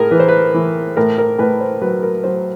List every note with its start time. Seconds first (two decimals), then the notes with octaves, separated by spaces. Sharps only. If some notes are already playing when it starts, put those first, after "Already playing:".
Already playing: A2 G#4 A#4
0.11 E3 B4
0.20 C5
0.28 B4
0.54 E3
0.97 A2 A#4
1.18 A#4
1.39 A2 B4
1.60 C5
1.81 F#3 B4
2.03 A#4
2.24 F#3 C5